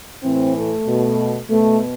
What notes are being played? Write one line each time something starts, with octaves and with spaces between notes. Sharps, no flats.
A2 E3 C4
A3
B2
B2 A3